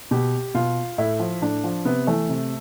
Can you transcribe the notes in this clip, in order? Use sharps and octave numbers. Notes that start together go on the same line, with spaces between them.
B2 G4
B2 F4
A2 E4
F3
A2 D4
F3
C3 B3
E3 A3
C3